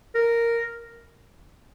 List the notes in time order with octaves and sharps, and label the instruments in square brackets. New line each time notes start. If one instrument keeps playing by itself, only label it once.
[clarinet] A#4